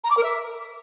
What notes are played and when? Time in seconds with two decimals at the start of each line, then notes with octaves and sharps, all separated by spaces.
0.04 A#5
0.10 D6
0.17 A#4
0.23 E5